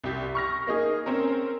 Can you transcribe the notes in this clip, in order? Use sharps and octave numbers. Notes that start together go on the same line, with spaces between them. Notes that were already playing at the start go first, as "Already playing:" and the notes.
C2 G4 B6
C#6 F6 A#6
A#3 D#4 G#4
C4 C#4 A#4